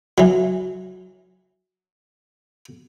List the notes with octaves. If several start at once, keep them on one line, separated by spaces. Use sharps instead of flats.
E3 F#3